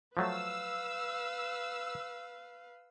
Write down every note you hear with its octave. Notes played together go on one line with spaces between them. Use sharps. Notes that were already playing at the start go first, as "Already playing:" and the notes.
F3 F#3 A3 B4 F5 E6